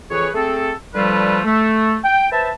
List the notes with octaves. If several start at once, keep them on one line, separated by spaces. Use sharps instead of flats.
F2 E3 G#4 B4 C#5
A3 C4 G#4 A4
D3 F3 G3 A3 F4 B4
A3
G5
B4 C5 E5 A5